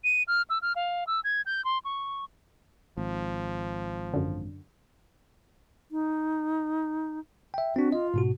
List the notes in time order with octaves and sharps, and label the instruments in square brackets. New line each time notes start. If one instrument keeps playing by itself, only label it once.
[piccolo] D#7
F6
E6
F6
F5
E6
G#6
G6
C6
C#6
[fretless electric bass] G#1 [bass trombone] F3
[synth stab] F#2 D3
[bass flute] D#4
[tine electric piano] E5 G5
[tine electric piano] C4 D4 [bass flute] F#4
[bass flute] F4 [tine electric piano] D#5
[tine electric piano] G#2 B2 F#4